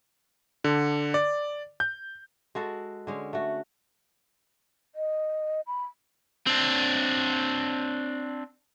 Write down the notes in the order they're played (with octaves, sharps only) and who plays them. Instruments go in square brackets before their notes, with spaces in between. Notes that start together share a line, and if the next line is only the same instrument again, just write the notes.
[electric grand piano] D3
D5
G6
[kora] G#3 F#4 A4
D3 G#3 C#4
A3 F#4
[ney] D#5
B5
[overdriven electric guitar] C4 D4